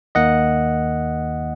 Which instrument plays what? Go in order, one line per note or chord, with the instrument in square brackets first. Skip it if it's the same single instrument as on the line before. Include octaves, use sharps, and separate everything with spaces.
[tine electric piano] D#2 D#3 A#3 D#5 F#5